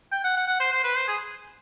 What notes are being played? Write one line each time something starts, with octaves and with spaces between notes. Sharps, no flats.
G5
F#5
F#5
F#5
C5
C5
B4
C5
G#4